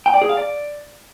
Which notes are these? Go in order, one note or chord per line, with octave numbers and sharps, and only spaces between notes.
G5
D5
G#4
F5
D5